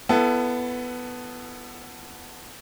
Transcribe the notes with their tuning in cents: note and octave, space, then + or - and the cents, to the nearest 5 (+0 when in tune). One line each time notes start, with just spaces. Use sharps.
B3 +5 E4 +30 A4 +5